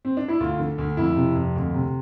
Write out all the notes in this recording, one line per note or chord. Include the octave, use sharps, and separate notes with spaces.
C4
D4
E4
D2 F4
D3
D2
F2 E4
C3
F2
D2
C3